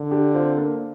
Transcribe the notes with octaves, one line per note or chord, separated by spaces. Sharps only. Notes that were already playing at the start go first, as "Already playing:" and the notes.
Already playing: D3
D4 G4
C4 F4
A#3 D4